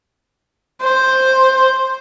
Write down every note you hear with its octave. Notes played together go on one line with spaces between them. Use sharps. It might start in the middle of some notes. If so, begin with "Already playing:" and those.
C5